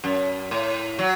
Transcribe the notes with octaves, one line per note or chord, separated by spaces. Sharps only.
F#2
A2
F#3